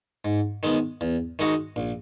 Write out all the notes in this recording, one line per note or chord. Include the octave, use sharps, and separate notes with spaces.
G#2
D#3 G#3 B3
E2
D#3 G#3 D#4 F#4
A#1